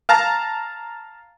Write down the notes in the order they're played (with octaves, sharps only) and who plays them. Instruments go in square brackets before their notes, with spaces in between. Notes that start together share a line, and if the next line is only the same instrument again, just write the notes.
[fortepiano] F5 A5 A#5